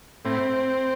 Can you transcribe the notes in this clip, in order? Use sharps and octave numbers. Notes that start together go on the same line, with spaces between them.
A2 C4